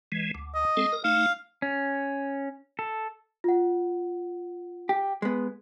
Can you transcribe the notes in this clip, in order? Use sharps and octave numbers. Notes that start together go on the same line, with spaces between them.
E3 G#3
D2
D#5
G#3 C4 A4
A#4
A3 D#4 F5
C#4
A4
F4 F#5
G4
G#3 B3